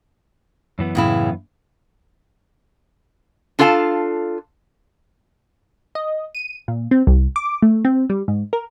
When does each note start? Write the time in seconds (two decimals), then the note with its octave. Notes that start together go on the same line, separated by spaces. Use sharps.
0.79 F#2 E3 B3
0.95 A2 C#3 E4
3.59 D4 F4 A4 F5 G#5 A5
5.95 D#5
6.35 D#7
6.68 A#2
6.91 C4
7.07 C2
7.36 D6
7.62 A3
7.85 C4
8.10 G3
8.28 G#2
8.53 A#4